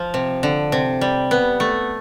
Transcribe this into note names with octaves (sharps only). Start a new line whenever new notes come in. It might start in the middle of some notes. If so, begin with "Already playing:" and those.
Already playing: F3
C3
D3
C3
G3
B3
A3